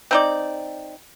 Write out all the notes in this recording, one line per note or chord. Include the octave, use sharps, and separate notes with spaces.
C4 D#4 D5